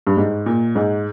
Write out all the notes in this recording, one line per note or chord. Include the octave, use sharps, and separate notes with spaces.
G2
G#2
A#2
G#2